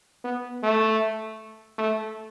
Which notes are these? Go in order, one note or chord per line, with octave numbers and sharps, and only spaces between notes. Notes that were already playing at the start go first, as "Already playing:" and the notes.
B3
A3
A3